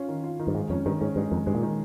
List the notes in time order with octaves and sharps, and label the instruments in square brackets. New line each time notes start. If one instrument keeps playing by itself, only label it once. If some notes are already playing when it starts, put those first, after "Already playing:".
Already playing: [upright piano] C#4 F4
D#3
F4
D#3
[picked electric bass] G2
[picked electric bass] G#2 [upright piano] G#3
[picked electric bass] F2 [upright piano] C#4
[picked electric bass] G2 [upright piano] D#3
[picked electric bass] G#2 [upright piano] C#4
[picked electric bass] G2 [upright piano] G#3
[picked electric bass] F2 [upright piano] D#3
[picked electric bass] G2 [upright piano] G#3
[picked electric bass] A#2
[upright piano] D#3